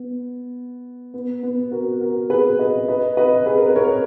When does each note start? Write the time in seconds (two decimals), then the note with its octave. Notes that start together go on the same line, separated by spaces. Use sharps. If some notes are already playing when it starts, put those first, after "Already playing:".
Already playing: B3
1.14 B3
1.43 B3
1.71 F#4 A#4
2.01 F#4 A#4
2.30 G#4 B4
2.59 B4 D#5
2.88 B4 D#5
3.17 B4 D#5
3.46 G#4 B4
3.57 A#4
3.66 B4
3.76 A#4 C#5